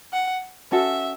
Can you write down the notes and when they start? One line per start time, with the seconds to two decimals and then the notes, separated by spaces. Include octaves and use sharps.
0.13 F#5
0.72 C#4 F#4 A4 E5